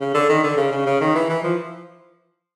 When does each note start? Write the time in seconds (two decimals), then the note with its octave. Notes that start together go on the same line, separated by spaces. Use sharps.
0.01 C#3
0.15 D3
0.29 D#3
0.44 D3
0.57 C#3
0.72 C#3
0.86 C#3
1.01 D#3
1.15 E3
1.30 E3
1.44 F3